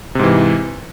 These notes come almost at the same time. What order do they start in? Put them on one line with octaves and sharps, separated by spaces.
C3 G#2 E3